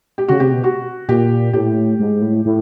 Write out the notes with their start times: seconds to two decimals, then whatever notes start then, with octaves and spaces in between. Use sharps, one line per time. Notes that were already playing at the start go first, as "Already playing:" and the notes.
0.18 G4
0.28 C#3 F#4
0.40 C3 G4
0.52 B2
0.64 F#4
1.09 A#2 G4
1.53 A2 G4
1.99 G#2
2.22 A2
2.45 A2